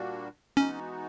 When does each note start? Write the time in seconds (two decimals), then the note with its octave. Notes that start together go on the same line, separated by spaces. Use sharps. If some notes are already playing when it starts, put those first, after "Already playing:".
Already playing: A#2 G3 A#3 D4 F#4
0.57 E3 G#3 B3 C#4 D#4 F#4